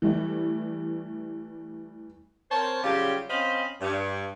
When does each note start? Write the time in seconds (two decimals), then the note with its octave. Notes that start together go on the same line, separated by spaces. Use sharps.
0.02 E3 G3 A3
2.51 C4 A#4 C5 C#5 A5
2.83 C#3 F#3 G3 F4 G4
3.29 C4 C#4 C5 D#5 F5 B5
3.81 G2